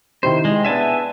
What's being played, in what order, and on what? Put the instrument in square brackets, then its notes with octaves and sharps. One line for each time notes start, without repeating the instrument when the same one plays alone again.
[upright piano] C3 D#3 E4 [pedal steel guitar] C5
[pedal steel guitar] G#3
[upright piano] B3 D4 [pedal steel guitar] E5 G#5 A5